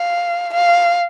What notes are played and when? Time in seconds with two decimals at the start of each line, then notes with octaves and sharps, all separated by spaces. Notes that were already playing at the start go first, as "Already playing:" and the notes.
Already playing: F5
0.54 F5